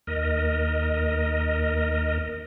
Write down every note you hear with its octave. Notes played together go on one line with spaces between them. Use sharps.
D#2 A#4 D#5